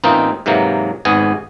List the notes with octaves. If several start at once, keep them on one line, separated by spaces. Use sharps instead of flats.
A1 E3 A#3 C4 D#4 F4
G#2 C3 E3 F#3 A#3
G#1 G#2 B3 G#4